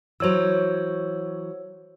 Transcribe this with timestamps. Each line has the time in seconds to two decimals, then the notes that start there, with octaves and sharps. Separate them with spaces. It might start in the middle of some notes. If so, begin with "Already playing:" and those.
0.20 E3 F#3 C5 C#5 E6